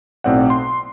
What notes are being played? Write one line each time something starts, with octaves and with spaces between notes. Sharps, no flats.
B1 A2 C4 D5 F#5
C6